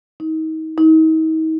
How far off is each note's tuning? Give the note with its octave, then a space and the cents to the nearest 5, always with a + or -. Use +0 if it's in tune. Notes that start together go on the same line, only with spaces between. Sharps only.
D#4 +35
D#4 +40